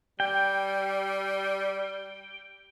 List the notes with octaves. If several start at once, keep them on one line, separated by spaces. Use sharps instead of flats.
G3 G5